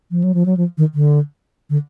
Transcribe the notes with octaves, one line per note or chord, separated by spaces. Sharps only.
F3
F#3
F3
F#3
F3
D#3
D3
D3